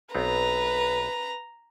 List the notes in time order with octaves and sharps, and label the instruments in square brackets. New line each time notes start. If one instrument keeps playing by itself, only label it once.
[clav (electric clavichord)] B1 B3 C4 [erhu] B4 [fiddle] A#5